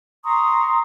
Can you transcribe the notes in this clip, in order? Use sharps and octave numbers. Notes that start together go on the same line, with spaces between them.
A#5 C6 C#6 D#6